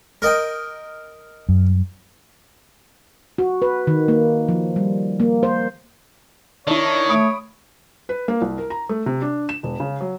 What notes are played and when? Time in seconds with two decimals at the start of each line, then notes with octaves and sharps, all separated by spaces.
0.22 A#4 D#5 G5
1.49 F#2
3.38 F#4
3.62 B4
3.87 D#3
4.08 A#3
4.49 F3
4.76 G3
5.20 A#3
5.43 C5
6.67 D#3 D4 E4 C#5
7.09 A3 B5 D#6 D7
8.09 B4
8.28 A#3
8.42 C2
8.58 A#4
8.70 A#5
8.89 A3
9.06 C3
9.22 D4
9.49 E7
9.63 E1
9.80 C#3
10.01 F#3